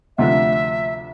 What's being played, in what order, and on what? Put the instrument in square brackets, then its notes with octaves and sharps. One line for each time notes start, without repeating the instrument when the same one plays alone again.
[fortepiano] D2 C3 F3 A3 D4 [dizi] E5